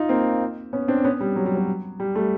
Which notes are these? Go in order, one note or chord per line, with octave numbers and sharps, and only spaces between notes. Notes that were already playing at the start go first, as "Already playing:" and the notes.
Already playing: D#4 F4
A#3 C4
B3 C#4
C4 D4
B3 C#4
G3
F#3
G3
F#3
G3
G3 A3